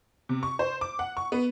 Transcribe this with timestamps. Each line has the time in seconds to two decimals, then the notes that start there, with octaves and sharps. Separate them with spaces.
0.29 C3
0.43 C#6
0.59 C5
0.81 D6
0.99 F#5
1.17 C#6
1.32 B3